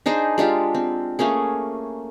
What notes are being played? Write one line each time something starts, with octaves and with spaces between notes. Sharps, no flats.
D4 D#4 G#4 C5
G#3 D4 F4 G4
C4
A3 A#3 C#4 G#4